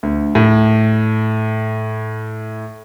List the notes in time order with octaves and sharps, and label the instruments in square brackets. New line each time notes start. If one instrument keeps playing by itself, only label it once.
[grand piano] D2
A2